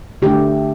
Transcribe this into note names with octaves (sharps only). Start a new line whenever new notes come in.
D3 A3 D4 G4